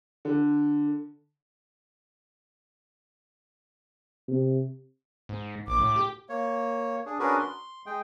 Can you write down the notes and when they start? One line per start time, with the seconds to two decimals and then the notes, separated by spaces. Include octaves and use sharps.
0.25 D3
4.28 C3
5.29 G#2
5.67 A#1 D6
5.80 A2
5.96 G4
6.29 A#3 C#5
7.06 D4 G#4
7.20 C#4 D4 F#4 G#4 A#4 B4
7.39 C6
7.86 G#3 G#4 G5